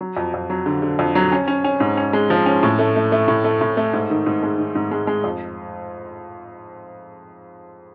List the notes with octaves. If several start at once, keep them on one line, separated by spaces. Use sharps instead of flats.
F#3
F2
F2
F#3
D3
D3
F2
F#3
C#4
C#4
C#4
G#2
C#4
G#3
F3
C#4
A2
A3
A3
A3
A2
A3
A2
A3
G#2
D#3
G#2
G#3
D#3
G#2
G#3
G#3
F2